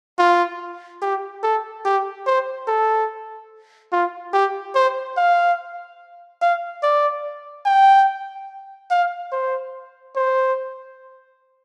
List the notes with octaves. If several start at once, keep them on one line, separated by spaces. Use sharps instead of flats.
F4
G4
A4
G4
C5
A4
F4
G4
C5
F5
F5
D5
G5
F5
C5
C5